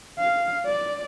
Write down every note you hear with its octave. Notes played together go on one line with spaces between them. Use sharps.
F5
D5